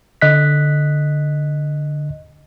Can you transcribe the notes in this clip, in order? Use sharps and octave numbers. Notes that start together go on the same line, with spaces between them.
D3 D#5 F#6 B6